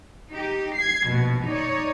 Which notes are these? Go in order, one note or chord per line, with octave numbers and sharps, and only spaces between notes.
D#4 G4
G#6 C7
A#1 D#2 B2
D#4 C#5 D5